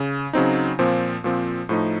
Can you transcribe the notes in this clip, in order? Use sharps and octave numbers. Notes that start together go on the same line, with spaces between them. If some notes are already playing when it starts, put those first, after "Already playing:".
Already playing: C#3
C#3 F#3 C4 D#4
A#2 F3 C4
A#2 F3 C4
A2 F3 A3 D#4